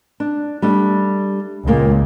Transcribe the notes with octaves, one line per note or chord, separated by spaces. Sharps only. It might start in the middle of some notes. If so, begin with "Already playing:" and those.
D4
G3 A3 D4
C#2 A#2 A#3